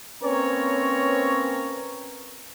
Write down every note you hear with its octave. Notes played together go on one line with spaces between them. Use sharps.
A#3 C4 C#4 B4 C#5 A#5